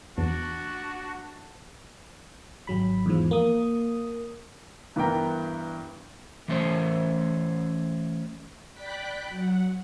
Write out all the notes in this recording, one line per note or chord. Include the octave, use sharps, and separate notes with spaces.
E2 D4 F#4
G#1 F#3 B5
E2 G#2 F3
A#3 D#6
G2 E3 B3 A#4 G5 A#5
E3 A3 C#4 C5 C#5
D5 G5 B5 D6 F#6 B6
F#3 F#5